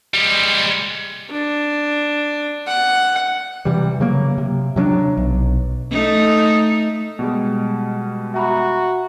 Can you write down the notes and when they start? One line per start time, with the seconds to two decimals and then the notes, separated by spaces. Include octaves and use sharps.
0.14 G3 G#3
1.31 D4
2.67 F#5
3.65 C3 E3 G3
4.00 C#3 F#3 A#3
4.38 C3
4.76 C3 F#3 C#4 D4
5.17 B1
5.92 A3 D#4
7.19 B2 G3 G#3
8.34 F#4 E5 A#5 B5